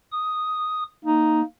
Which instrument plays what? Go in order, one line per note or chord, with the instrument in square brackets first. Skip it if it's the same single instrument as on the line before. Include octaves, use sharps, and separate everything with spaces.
[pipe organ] D#6
[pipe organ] A#3 [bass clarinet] D#4